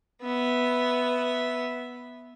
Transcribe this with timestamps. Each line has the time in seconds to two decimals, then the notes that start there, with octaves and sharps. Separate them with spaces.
0.22 B3 E5